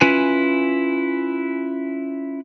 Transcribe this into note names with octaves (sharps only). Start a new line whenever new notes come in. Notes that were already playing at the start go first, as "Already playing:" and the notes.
C#4 E4 F4 B4 G#5